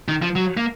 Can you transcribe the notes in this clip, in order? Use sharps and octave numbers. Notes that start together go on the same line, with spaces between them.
D#3
F3
F#3
A#3